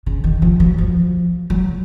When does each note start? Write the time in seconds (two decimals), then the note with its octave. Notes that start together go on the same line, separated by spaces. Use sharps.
0.06 C#3
0.24 D#3
0.42 F3
0.60 F#3
0.78 F3
1.50 F#3